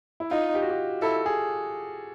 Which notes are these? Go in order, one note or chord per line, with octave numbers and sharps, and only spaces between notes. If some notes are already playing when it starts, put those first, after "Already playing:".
E4
D#4 F4
G4
F#4
G4
E4 A4
G#4